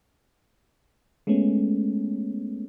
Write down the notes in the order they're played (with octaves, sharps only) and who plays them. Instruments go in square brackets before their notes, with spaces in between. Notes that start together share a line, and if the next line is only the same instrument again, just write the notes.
[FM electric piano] G#3 A3 B3 C#4